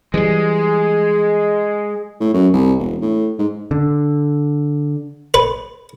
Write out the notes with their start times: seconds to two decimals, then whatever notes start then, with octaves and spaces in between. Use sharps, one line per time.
0.14 E3 G3 G#3 G#4
2.20 A2
2.34 F#2
2.54 C2
2.79 E1
3.01 A2
3.39 G#2
3.71 D3
5.34 B4